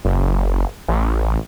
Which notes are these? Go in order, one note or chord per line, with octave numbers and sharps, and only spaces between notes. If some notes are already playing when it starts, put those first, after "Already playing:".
F#1
A1